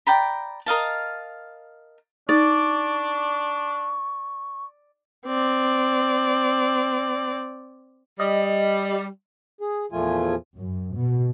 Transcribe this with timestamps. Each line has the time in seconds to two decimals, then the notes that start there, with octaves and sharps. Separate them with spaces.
0.07 D5 G5 A#5 B5
0.66 A#4 D#5 F5 A5
2.29 D4 D#4 D5 C#6
5.26 C4 D5
8.20 G3 D#5
9.61 G#4
9.92 E2 A#2 F3 A3 F4 G#5
10.58 F#2
10.96 B2